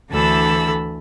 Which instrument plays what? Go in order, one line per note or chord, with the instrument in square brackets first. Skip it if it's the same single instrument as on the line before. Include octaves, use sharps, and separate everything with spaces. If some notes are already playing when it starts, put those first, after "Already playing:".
[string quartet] D2 D3 E3 A4 B5 E6